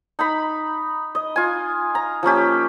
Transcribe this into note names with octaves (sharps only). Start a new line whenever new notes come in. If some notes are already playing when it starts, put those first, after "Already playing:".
D#4 A#5 B5
D#5
F4 G#5
A#5
F3 A#3 C#4 G4